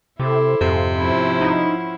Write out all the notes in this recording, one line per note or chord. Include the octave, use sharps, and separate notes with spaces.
C3 E4 A4 C5 D6
F2 G#2 C3
F3 C#4 E4
D#4 F#5 G5 B5